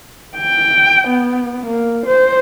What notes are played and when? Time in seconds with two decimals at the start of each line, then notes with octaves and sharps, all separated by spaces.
0.38 G5
1.08 B3
1.66 A#3
2.07 C5